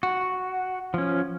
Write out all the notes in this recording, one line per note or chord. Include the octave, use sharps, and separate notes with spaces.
F#4
F3 C#4